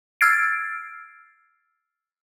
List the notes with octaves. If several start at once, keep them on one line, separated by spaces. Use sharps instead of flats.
E6 F6 G#6 A6 C7 D7